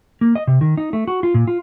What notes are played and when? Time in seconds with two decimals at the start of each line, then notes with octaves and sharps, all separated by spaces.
0.21 A#3
0.35 D#5
0.47 C3
0.61 D#3
0.77 D#4
0.93 A3
1.08 F#4
1.23 F4
1.34 A#2
1.47 F4